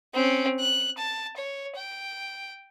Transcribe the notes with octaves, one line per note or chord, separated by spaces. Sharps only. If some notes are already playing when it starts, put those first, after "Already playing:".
C4 C#4
F#6
A5
C#5
G5